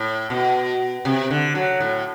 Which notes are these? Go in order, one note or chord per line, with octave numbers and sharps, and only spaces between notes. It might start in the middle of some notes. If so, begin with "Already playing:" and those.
Already playing: A2
B2
C3
D3
F#3
A2